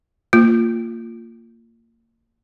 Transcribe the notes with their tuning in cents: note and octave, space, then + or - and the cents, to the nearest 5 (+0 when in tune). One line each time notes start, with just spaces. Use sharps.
A#3 -25 F4 +0